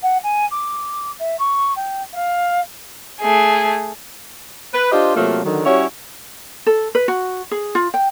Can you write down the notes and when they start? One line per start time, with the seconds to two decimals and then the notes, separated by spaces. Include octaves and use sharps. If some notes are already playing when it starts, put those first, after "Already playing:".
0.02 F#5
0.23 G#5
0.50 D6
1.19 E5
1.39 C#6
1.76 G5
2.13 F5
3.21 A3 G#4
4.74 B4
4.92 D4 F4 G4 C5 D#5
5.15 C3 F#3 A3 A#3 F4
5.44 D3 D#3 F#3
5.65 G3 C#4 E4 F#4 C#5
6.66 A4
6.95 B4
7.08 F#4
7.51 G#4
7.75 F4
7.94 G5